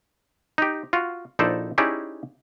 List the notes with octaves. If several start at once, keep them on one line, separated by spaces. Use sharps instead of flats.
D#4 G4
F4 F#4
A#1 D#4 E4 A4 C5 D5
C#4 D#4 E4 G4 G#4 D5